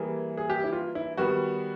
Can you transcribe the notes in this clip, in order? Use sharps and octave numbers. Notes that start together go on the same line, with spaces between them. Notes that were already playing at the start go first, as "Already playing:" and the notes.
Already playing: E3 G3 A#3 G#4
G#4
G4
E4
F4
E4
D#3 G3 B3 F#4